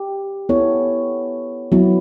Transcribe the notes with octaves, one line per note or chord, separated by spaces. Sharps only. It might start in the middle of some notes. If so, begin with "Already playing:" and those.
Already playing: G4
B3 E4 A4 C#5
F#3 B3 E4